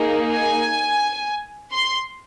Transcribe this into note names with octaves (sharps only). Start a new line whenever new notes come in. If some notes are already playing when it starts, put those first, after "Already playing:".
Already playing: A#3 D#4 G#4
G#5
C6